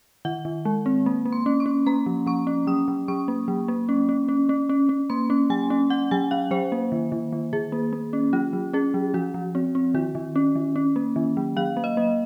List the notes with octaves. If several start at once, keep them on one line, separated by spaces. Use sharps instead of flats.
D#3 F#5
D#3
G#3
C4
A#3
A#3
C6
C#4
C#6
C#4
A#3 A#5
F3
F3 C#6
C#4
F#3 D#6
F#3
F#3 C#6
A#3
F#3
A#3
C#4
C#4
C#4
C#4
C#4
C#4
A#3 C6
C#4
F#3 G#5
C#4
C#4 F#5
F#3 G#5
F#3 F5
F#3 C5
A#3
D#3
D#3
D#3
D#3 G#4
A#3
A#3
C#4
F#3 F4
F#3
C#4 G#4
F#3
F3 F#4
F3
C4
C4
D#3 F#4
D#3
C#4
D#3
C#4
A#3
D#3
F#3
F#3 F5
A#3
D#5
A#3